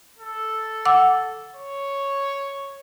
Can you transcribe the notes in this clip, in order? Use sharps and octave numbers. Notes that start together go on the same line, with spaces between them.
A4
F#5 D6 E6
C#5